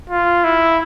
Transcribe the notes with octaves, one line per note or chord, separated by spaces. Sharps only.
F4
E4